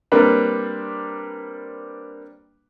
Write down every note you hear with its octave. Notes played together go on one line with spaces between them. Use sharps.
G3 A#3 C4 D4 B4